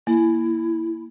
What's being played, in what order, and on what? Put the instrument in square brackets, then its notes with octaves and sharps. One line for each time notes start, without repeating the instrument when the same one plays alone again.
[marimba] A#3 [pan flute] E4